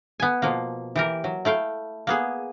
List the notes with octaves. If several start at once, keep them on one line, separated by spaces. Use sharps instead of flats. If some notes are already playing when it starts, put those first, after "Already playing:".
B3 G#5
B2 F3 A#3
E3 G4 A#4
F#3
A3 E4 F5 G5
A#3 B3 G#4